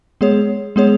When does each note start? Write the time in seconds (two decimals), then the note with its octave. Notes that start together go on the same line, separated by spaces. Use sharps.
0.21 G#3 B3 G#4 C#5
0.76 G#3 B3 G#4 C#5